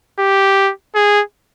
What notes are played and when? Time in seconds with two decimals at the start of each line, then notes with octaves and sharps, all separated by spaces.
0.19 G4
0.95 G#4